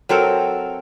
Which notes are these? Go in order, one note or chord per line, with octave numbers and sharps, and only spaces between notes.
F#3 C4 A4 A#4